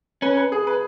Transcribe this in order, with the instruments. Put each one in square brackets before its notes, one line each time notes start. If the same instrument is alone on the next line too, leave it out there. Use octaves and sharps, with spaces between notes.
[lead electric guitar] C#4 [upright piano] B4
[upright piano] B4
G#4
B4